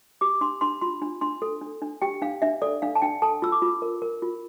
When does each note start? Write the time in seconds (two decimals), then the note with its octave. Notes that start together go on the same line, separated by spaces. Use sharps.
0.21 G4 D6
0.41 D4 C6
0.61 D4 C6
0.81 F4 C6
1.02 D4
1.21 D4 C6
1.42 A4
1.61 D4
1.82 D4
2.02 G4 G5
2.22 D4 F5
2.42 D4 E5
2.62 A4 D5
2.82 D4 F5
2.95 A5
3.02 D4 G5
3.22 A4 A5
3.42 F4 E6
3.52 D6
3.62 F4
3.82 A#4
4.02 A#4
4.22 F4